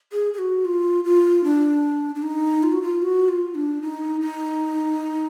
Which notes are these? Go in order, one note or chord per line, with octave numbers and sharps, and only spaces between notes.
G#4
G#4
F#4
F4
F4
D4
D4
D#4
F4
F#4
F4
F#4
F4
D4
D#4
D#4